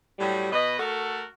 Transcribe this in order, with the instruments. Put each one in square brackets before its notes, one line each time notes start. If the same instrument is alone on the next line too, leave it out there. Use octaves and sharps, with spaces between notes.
[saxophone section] A2 F#3 G3
B2 B4 D#5
A3 F#4 A4 A#4